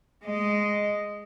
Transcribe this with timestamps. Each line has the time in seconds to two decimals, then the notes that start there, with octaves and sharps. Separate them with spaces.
0.24 G#3 D#5